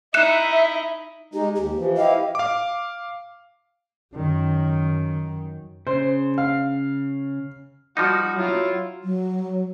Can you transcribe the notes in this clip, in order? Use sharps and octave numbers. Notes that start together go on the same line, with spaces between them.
D#4 E4 E5 F#6 C#7 E7
G#3 D#4 G4
D#2 G4
E3 F3
E4 G4 D#5 F5
F5 D6
F#2 D#3
C#3 C5
F5
F3 G3 D#4 F#4
F#3 E4 F4
F#3